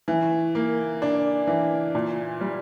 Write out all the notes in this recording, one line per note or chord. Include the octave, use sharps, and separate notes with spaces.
E3
A#3
D4
E3
A#2
G3